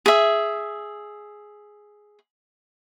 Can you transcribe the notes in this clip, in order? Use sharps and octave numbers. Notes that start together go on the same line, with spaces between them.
G#4 E5